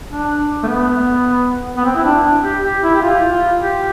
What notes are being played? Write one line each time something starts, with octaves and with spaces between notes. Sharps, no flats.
D4
A3
B3
B3
C4
E4
D4
G4
G4
E4
G4
F4
F4
G4